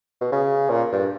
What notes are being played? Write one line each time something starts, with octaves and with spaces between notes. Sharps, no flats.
B2
C#3
A#2
G2